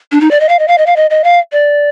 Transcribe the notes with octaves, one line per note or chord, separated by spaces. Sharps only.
D4
D#4
D5
D#5
F5
D#5
F5
D#5
F5
D#5
D#5
F5
D5